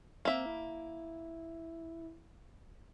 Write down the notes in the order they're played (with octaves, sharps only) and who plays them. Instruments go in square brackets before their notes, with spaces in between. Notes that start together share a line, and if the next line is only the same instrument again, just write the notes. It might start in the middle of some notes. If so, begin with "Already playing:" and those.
[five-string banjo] A#3 E5 [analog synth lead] C4
[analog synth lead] E4